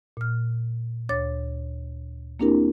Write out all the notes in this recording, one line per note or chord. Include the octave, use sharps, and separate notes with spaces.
A#2 F6
D2 C#5 D6 A6
A#3 C4 D4 E4 G4 A#4